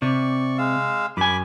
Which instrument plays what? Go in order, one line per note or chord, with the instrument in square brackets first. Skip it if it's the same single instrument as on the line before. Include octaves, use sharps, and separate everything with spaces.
[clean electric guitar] C3 [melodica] D5 C#6
[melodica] G#3 F5 E6
[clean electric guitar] F#2 G#5 [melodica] B5 D6